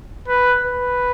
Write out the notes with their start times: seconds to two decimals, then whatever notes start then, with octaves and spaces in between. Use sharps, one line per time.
0.28 B4
0.65 B4